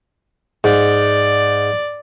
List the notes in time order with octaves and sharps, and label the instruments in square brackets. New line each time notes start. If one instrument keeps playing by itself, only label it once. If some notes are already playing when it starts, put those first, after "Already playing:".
[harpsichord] G#2 [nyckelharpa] D5